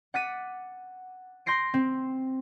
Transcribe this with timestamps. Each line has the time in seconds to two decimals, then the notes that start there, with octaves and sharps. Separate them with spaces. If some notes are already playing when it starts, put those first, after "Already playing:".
0.14 F#5 D6 F#6 A6 B6 D#7
1.46 C6 G6 A#6 C7 D7
1.74 C4